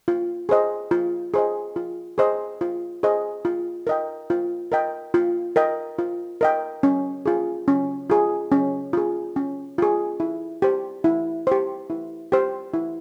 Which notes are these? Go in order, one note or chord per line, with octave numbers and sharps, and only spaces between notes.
F4
G#4 C5 D#5
F4
G#4 C5 D#5
F4
G#4 C5 D#5
F4
G#4 C5 D#5
F4
A#4 D#5 G5
F4
A#4 D#5 G5
F4
A#4 D#5 G5
F4
A#4 D#5 G5
C#4
F4 G#4
C#4
F4 G#4
C#4
F4 G#4
C#4
F4 G#4
E4
G4 C5
E4
G4 C5
E4
G4 C5
E4